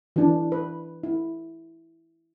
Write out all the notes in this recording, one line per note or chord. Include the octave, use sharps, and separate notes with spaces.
E3 D4
B4
E4